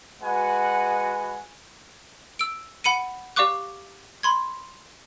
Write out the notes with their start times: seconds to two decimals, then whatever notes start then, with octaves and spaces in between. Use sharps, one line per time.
0.22 G#3 F#4 B4 F#5 G#5
2.39 E6 D7
2.84 F#5 B5 C#7 D#7
3.36 G4 D5 F5 C#6 D6 F#6
4.23 B5 C6 G#6